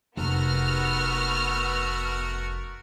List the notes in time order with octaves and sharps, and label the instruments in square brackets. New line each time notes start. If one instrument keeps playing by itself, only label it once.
[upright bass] F1 [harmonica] A3 F#4 A#4 [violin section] B3 F6